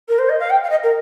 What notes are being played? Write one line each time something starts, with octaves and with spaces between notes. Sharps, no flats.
A#4
C5
D#5
F5
G5
F5
D#5
A#4